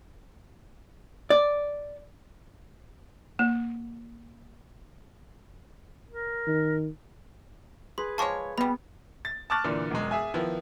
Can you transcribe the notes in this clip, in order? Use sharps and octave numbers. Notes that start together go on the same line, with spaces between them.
D5
A#3
A#4
D#3
G#4 B4 C6
F3 G#3 C#5 A5 C#6 D6
B2 G3 B3 B5
A6
A5 C#6 D6 F6 F#6 A6
A#2 D3 E3
E1 F#2 G#3
G#4 E5 G#5
D#3 F3 B3 E4